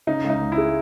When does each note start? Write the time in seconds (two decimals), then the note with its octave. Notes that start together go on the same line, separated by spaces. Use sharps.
0.07 C#3 D#4
0.24 C#2
0.30 D#4
0.41 C#2
0.52 E4
0.58 G#3